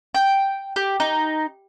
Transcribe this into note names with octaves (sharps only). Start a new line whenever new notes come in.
G5
G4
D#4